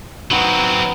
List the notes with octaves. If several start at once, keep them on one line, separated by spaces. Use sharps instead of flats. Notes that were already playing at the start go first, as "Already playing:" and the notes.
D#3 F#3 B3 C4